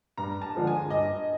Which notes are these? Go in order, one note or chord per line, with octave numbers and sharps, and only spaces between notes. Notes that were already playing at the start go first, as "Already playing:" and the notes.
G2 A#5
A5
D3 F3 G#3
G#5
G2 D#5